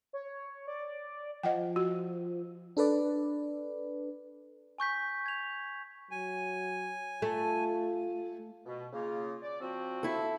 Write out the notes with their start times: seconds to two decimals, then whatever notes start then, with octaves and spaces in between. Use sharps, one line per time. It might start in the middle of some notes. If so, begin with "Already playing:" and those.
0.13 C#5
0.67 D5
1.43 F3 D#5 F#5 G5
1.76 F#4
2.77 D4 A4 B4 D5
4.78 G#5 C#6 G6 B6
5.26 G#6 F7
6.11 F#3 G#5
7.22 A3 F4
8.66 B2
8.93 C#3 A#3 F4
9.42 D5
9.60 F3 C4 F#4
10.03 E4 A4